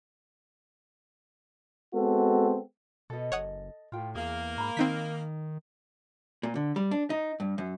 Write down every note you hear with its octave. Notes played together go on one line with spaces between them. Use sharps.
G#3 B3 C4 F#4 A4
B2 A4 D#5
F#1 C#5 F#5 D#6
A2 F4 G5
E2 A#3 G#4
G#2 A#5 B5
D#3 C4 D#4 B6
A#2
D3
G3
D4
D#4
G2
F#2